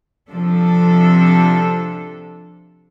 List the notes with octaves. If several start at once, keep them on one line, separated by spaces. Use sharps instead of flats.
C3 F3 D4 A4